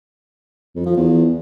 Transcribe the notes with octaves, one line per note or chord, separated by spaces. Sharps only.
F2
F3
E2